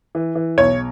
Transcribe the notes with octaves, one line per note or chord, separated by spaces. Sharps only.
E3
E3
B1 C#5